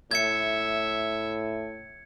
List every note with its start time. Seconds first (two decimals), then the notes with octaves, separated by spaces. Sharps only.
0.11 A2 E5 G#6 C#7